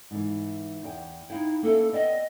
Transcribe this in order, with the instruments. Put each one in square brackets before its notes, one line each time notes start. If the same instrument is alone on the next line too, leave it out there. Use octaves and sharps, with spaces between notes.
[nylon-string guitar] G#2 E3
E2 G5
[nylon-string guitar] D#4 F5 G5 [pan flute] E4
[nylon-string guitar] A#3 C#4 E4 [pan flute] A4
[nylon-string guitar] B3 D5 G5 [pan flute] D#5